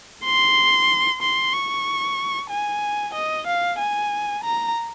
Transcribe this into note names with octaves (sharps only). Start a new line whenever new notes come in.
C6
C6
C#6
G#5
D#5
F5
G#5
A#5